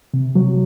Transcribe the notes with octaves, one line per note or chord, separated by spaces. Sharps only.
C3
F#3